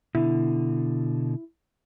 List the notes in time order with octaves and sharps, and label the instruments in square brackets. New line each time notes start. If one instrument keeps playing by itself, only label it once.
[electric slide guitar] B2 D3 [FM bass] E4